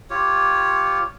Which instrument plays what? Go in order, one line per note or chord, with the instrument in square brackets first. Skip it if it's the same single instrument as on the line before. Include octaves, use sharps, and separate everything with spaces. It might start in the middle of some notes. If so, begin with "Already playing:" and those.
[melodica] F4 G4 C#5